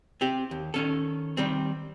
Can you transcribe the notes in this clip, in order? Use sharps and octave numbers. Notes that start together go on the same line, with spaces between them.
C4 G4
D#2
D#3 C#4 A4
D#3 G3 C4